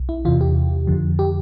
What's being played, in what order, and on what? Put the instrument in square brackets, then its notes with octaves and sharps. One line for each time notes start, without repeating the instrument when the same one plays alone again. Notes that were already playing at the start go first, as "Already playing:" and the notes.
Already playing: [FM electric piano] B1
E4
E2 C3 E3 F4
G4
F2 D3 F3
G4